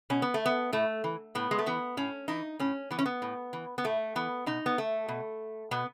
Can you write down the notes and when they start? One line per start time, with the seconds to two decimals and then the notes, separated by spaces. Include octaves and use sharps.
0.10 B2 C#4
0.22 B3
0.34 A3
0.46 B3
0.73 A2 A3
1.04 E3
1.35 A2 B3
1.51 G#3
1.59 A3
1.66 E3 B3
1.97 A2 C#4
2.28 E3 D#4
2.59 A2 C#4
2.91 E3 B3
2.99 C#4
3.06 B3
3.22 A2
3.53 E3
3.78 B3
3.84 A2 A3
4.16 E3 B3
4.46 B2 D#4
4.66 B3
4.78 A3
5.08 B2
5.71 B2 B3